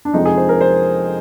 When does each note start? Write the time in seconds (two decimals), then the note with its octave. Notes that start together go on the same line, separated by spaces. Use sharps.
0.05 D4
0.13 F2 C3 F3 G#3 D#4
0.26 G#4
0.37 C5
0.49 A#4
0.61 C5